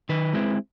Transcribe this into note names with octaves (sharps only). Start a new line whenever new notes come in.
D#3 B4
G#3 C4 E4